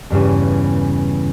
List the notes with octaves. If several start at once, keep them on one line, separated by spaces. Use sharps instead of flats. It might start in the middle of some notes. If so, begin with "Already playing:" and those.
E2 G2 C#3 E3